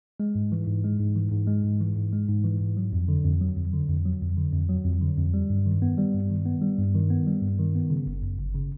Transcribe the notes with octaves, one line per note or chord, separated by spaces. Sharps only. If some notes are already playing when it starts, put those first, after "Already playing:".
G#3
G#2
E3
G#2
G#3
G#2
E3
G#2
G#3
G#2
E3
G#2
G#3
G#2
E3
G#2
F#3
F2
D3
F2
F#3
F2
D3
F2
F#3
F2
D3
F2
F#3
F2
D3
F2
G3
G2
D#3
B3
G3
G2
D#3
B3
G3
G2
D#3
B3
G3
G2
D#3
B3
C#3
G1
F#2
G1
C#3